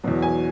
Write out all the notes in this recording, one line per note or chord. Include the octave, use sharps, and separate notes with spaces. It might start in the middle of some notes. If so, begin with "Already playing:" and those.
E2 B2 F#3
G#5